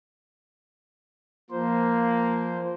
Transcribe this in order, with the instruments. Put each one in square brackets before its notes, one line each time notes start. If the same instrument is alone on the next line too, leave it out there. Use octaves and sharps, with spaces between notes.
[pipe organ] F3 C5 [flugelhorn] A#3